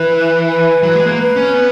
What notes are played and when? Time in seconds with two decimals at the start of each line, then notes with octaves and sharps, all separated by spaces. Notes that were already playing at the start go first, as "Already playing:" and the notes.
Already playing: E3 B4
0.47 B4
0.83 F#3
0.95 G#3
1.06 A#3
1.18 B4
1.36 C#4
1.54 B3